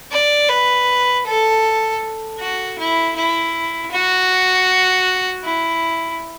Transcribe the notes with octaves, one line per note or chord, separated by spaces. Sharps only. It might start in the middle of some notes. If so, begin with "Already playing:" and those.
D5
B4
A4
F#4
E4
E4
F#4
E4